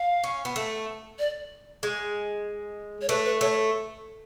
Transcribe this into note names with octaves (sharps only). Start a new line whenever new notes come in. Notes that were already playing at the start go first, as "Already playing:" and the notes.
Already playing: F5
C#4
B3
A3
D5
G#3
C#5
A3 B4
B4
A3 C#5